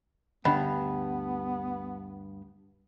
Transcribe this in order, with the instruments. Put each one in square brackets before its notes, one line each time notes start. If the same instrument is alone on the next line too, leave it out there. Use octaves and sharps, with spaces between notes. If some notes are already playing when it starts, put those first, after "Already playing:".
[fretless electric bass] D2 D3 D4 [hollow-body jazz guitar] G2 [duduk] B3 [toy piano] D#5 F#5 B5